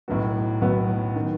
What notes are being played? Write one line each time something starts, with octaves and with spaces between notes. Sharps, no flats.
B1 A2 F#3 B3 F#4
B1 A2 F#3 B3 F#4
D#3